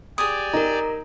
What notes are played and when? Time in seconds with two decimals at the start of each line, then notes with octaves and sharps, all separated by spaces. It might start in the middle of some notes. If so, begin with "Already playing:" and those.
0.18 G4 G#4 D5 G#5 D#6
0.54 D#4 A#4 A#5